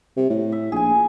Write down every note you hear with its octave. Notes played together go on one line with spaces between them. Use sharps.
C3
A2
E5
A#1 G#4 G#5